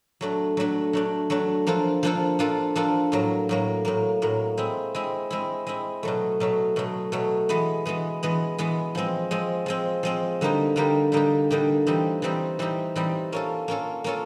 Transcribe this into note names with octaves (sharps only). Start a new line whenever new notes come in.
F#3 A3 D4
F#3 A3 D4
F#3 A3 D4
F#3 A3 D4
F3 A#3 D4 F4 A4
F3 A#3 D4 F4 A4
F3 A#3 D4 F4 A4
F3 A#3 D4 F4 A4
A2 F#3 A#3
A2 F#3 A#3
A2 F#3 A#3
A2 F#3 A#3
G#3 C4 E4
G#3 C4 E4
G#3 C4 E4
G#3 C4 E4
B2 F#3 A3
B2 F#3 A3
B2 F#3 A3
B2 F#3 A3
E3 G#3 B3
E3 G#3 B3
E3 G#3 B3
E3 G#3 B3
F3 G#3 C4
F3 G#3 C4
F3 G#3 C4
F3 G#3 C4
D3 G3 A#3 D#4 G4
D3 G3 A#3 D#4 G4
D3 G3 A#3 D#4 G4
D3 G3 A#3 D#4 G4
E3 G3 C4 D#4 G4
E3 G3 C4 D#4 G4
E3 G3 C4 D#4 G4
E3 G3 C4 D#4 G4
A#3 C#4 F4 A4
A#3 C#4 F4 A4
A#3 C#4 F4 A4